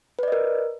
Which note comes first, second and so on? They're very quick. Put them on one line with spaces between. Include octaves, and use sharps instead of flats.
B4 D5 D#5 A#4